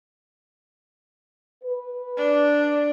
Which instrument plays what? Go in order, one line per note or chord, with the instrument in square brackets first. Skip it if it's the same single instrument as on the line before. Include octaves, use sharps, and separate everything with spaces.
[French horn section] B4
[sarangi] D4